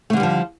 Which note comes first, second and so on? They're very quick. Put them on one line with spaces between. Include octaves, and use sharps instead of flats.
A3 D3 G3 E3 F3